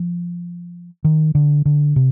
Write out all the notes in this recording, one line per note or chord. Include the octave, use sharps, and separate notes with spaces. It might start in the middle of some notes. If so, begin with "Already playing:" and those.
Already playing: F3
D#3
D3
D3
C3